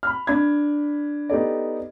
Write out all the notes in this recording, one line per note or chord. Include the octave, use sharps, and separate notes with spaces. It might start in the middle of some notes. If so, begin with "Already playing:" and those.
B5 F6
D4 B5 G#6
B3 D#4 G4 A4 D5